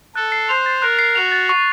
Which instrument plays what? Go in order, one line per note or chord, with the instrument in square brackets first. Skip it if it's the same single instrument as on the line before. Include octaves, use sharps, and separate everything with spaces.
[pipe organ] A4 [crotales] F#6
[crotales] C7
[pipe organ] C5 [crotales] F7
[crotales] A6
[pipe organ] A#4 [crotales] F#6
[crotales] C7
[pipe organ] F#4 [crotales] F7
[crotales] A6
C#6